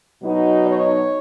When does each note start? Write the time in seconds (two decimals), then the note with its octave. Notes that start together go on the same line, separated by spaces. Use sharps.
0.23 B2 F#3 B3 D#4
0.65 C#5